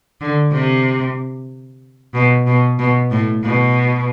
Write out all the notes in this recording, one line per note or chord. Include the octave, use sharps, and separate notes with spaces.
D3
C3
B2
B2
B2
A2
B2